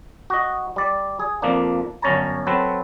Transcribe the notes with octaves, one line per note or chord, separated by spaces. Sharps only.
F#4 D#5
G3 D5
G#4
F2 F3 A#3 D4
G1 F#2 C#4 C#5 A5 A#5
F#3 C4 A4 B4